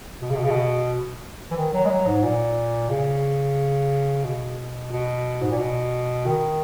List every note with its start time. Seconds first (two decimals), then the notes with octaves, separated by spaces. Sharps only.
0.22 B2
0.30 C#3
0.36 B2
0.44 C#3
0.51 B2
1.51 E3
1.56 D#3
1.73 F#3
1.85 G#3
1.90 F#3
2.07 G#2
2.23 A#2
2.90 C#3
4.25 B2
4.92 B2
5.42 G#2
5.50 A#2
5.58 B2
6.26 D#3